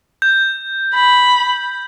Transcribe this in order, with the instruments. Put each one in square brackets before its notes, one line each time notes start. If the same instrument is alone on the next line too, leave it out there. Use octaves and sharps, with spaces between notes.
[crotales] G6
[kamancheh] B5